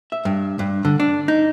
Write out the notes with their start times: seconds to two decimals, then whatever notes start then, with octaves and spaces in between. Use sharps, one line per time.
0.12 E5
0.25 G2
0.59 G2
0.85 D3
1.00 D4
1.28 D#4